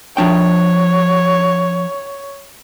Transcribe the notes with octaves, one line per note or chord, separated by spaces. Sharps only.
F3 D4 C#5 G5